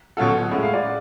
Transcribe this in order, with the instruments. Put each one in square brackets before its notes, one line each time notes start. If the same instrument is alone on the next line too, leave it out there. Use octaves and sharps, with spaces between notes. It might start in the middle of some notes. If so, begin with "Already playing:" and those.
[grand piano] B2 F#3 C#4 F4 A4 [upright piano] F#5
[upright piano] F#5
F#5
[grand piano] A2 G#3 C#4 [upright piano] F#5
[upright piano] F5
D5